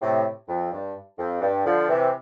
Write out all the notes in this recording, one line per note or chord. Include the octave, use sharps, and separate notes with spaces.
A2 C3
F2
G2
F2
G2
D3 F3
C3 E3